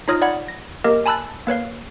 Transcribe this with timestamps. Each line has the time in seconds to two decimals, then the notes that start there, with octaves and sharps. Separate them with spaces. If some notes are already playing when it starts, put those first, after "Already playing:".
0.08 D#4 F4 C#5 D#6 F6 A#6
0.21 D5 F#5 B5 G#6
0.48 A#6
0.84 A#3 G4 A#4 D#5
1.06 G#5 A5 B5 E6 F#6 A6
1.47 A#3 B4 C#5 F5